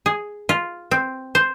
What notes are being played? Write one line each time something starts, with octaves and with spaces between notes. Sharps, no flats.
G#4
F4
C4
C5